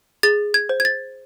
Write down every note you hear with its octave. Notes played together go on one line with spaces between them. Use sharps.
G#4 A6
G#6
C5
G#6
A6